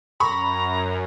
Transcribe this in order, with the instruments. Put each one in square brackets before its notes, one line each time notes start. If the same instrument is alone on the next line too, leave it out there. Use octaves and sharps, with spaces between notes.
[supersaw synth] F#2 [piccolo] A#5 [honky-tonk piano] B5 C#6